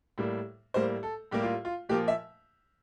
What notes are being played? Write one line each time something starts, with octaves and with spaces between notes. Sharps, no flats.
A2 G3 A#3
A2 G3 A#3 C5
A4
A2 G3 A#3 G4
F4
F4
A#2 F3 A#3 G4
E5